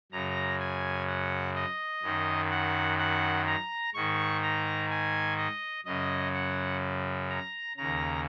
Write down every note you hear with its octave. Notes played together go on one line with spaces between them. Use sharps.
F#2 C#3 A#5
G#5
F#5
D#5
F#2 D#3
F#5
F#5
A#5
G#2 D#3 C#6
A#5
G#5
D#5
F#2 C#3 D#5
F#5
A#5
D#2 C#3 A#5